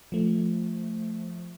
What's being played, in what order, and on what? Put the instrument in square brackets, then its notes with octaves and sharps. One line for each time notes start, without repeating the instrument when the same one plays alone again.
[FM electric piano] F3 A3